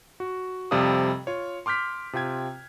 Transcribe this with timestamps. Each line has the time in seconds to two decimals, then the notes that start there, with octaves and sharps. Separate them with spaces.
0.20 F#4
0.71 F2 C3 G3 D5 F5 D#6
1.27 F4 C#5
1.66 C6 D6 F6 G6 B6
2.13 C3 F4 G5 G#6